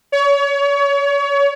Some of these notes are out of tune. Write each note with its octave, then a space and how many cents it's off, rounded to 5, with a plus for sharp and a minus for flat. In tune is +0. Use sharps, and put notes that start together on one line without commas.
C#5 +30